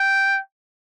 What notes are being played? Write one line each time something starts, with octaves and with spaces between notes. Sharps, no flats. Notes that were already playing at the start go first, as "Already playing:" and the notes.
Already playing: G5